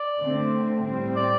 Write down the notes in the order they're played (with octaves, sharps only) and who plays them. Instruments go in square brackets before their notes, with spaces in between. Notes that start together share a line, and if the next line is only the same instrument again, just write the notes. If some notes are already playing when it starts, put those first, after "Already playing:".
Already playing: [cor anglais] D5
[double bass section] D3 A3 C4
A2 G3 C4
[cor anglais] D5